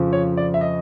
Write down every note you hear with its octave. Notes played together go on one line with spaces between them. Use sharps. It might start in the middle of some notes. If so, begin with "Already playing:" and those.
Already playing: F2 C#3 F3
C#5
D5
E5
D#5